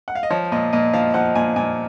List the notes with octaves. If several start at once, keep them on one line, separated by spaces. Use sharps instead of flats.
F#5
F5
D#5
F3 C#5
A#2 D#5
A#2 D#5
F3 F5
F3 F#5
A#2 G#5
A#2 G#5